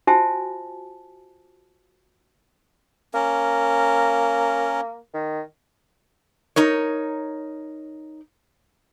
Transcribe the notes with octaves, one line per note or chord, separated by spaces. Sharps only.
F4 F#4 C5 E5 G#5 A5
A#3 C#4 A#4
D#3
D#4 A#4 C#5